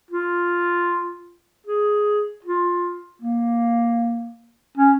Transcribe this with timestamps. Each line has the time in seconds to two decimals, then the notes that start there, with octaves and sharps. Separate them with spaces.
0.11 F4
1.67 G#4
2.45 F4
3.22 A#3
4.78 C#4